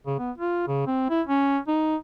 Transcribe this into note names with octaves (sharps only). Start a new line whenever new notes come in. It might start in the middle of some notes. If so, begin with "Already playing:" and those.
C#3
B3
F4
C#3
C4
E4
C#4
D#4